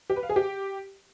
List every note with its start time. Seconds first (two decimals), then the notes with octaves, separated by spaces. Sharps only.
0.10 G4
0.16 B4
0.23 F5
0.29 G#4
0.36 G4